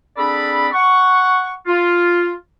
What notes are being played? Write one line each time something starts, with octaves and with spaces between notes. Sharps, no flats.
C4 D4 G#4 A4 D5 B5
F#5 C#6
F4